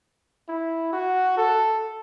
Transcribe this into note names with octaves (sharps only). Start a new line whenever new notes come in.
E4
F#4
A4